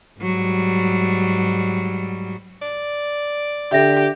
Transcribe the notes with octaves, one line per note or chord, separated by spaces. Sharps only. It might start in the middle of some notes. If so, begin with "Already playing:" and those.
G#2 F#3 G3
D5
D3 G4 E5 A#6